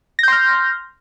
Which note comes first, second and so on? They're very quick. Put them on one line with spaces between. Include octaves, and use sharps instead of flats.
A#6 G6 C6 F6